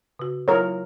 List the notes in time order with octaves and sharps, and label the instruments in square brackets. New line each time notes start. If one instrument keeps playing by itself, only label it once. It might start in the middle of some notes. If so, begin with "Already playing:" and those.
[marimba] C#3 F#4
[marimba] F#3 E4 F4 [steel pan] A#4 C#5